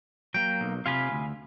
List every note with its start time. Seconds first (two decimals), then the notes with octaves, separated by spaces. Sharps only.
0.34 F#3 A#3 G5
0.61 B1
0.86 C3 F4 F5 G#5 B5
1.12 D2